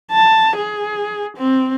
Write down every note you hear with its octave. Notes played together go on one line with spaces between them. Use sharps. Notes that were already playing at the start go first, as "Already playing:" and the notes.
A5
G#4
C4